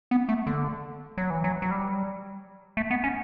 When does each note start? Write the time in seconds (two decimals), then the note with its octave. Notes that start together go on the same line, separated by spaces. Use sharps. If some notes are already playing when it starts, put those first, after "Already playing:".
0.11 B3
0.29 A3
0.47 D3
1.18 F#3
1.30 E3
1.44 F#3
1.62 F#3
1.71 G3
2.77 A3
2.91 B3
3.04 C#4